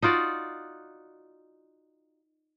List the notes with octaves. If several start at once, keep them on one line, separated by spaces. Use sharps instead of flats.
D#4 F4 F#4 D5